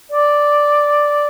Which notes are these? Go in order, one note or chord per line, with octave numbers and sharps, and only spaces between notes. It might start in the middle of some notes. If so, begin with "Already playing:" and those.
D5